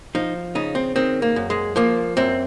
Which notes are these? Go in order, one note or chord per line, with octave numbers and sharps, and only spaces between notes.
F3 D#4
C#3 D#4
C4
D#3 C4
A#3
F#2
G#3
F3 A#3
F#2 C4